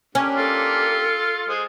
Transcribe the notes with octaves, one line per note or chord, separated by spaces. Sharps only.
A#3 C#4 D4 G4
F4 A4
G#3 C5 D#6